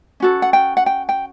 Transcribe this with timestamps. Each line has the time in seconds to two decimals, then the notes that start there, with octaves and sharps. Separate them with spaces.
0.20 C#4 F#4 A4
0.42 F#5
0.53 G5
0.77 F#5
0.86 G5
1.09 G5